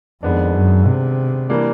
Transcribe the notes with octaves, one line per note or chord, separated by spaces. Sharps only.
F2 D#3 G#3 B3 D4
F#2
C3
E3 G3 A#3 D4